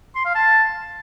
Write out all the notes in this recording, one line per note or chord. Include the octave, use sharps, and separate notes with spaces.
C6
F5
A5